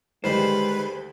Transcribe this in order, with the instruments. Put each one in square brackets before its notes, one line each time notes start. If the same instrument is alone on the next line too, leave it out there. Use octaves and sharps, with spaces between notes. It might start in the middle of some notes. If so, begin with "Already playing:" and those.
[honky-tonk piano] D2 G3 [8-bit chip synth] D#3 B4 B5 [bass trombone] G#3 [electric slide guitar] C5